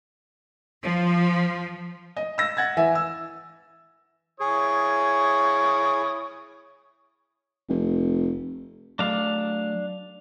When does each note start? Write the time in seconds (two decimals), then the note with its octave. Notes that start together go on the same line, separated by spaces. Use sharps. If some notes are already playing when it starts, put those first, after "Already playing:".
0.84 F3
2.16 D#5
2.38 E6 A#6
2.57 F#5 G#6 A6
2.77 E3 E5 G#5
2.95 E6
4.40 E4 G#4 C#5 D#6
7.69 F1
8.99 F#3 A3 D4 F5